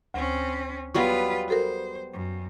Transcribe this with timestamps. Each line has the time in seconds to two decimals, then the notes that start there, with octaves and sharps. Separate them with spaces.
0.14 D2 C4 C#4
0.94 F#3 G3 B3 F4 B4 F#5 C#6
1.48 F#4 A4 A#4 C5
2.13 F#2